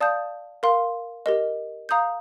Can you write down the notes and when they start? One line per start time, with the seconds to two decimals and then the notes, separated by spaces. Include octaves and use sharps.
0.01 D5 F5 A5 D#6 G6
0.63 A#4 F5 C6
1.26 G4 A#4 D#5
1.89 F5 A#5 D#6 G6